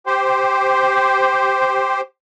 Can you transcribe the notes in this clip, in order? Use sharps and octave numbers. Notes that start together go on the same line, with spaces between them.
G4 C5